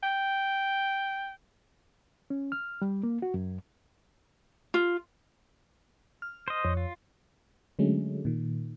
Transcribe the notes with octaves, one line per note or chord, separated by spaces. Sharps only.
G5
C#4
F6
G3
A#3
F#4
F#2
F4
F6
C5 D#5
F2 C#5
F4
D3 F#3 G#3 A3 C#4
A#2 D#3